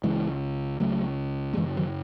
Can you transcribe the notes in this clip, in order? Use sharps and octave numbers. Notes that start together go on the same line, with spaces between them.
C#2 C#3 E3 G#3
C#2 C#3 F#3 A3
A3
F#2 C#3 E3 G#3
D#3 F#3